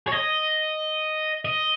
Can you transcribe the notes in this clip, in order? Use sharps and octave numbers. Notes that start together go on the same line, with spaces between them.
C#5
D#5
D#5